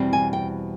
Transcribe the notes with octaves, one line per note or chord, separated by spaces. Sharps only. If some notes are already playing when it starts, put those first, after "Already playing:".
Already playing: E2 B2 G3 C4
G#5
G5